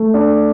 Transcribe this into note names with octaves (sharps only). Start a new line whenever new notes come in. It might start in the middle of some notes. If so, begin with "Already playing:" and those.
Already playing: A3
D4